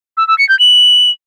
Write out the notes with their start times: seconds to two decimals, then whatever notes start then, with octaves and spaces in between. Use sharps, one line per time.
0.17 E6
0.28 E6
0.38 C#7
0.49 G6
0.59 F#7